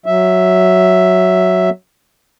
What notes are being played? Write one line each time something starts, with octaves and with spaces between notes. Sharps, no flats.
F#3 E5